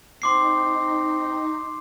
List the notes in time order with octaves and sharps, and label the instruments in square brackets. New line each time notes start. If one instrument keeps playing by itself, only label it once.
[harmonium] C4 [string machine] D#4 [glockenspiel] C6 D6 C7